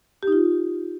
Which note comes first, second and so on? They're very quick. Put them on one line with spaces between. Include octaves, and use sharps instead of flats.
G4 D#4 F4